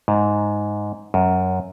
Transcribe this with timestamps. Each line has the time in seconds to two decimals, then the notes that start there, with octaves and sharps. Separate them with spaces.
0.08 G#2
1.14 F#2